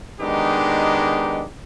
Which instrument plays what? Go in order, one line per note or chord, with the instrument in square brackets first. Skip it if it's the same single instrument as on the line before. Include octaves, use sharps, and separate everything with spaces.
[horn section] D#3 G#3 B3 D4 D#4 G4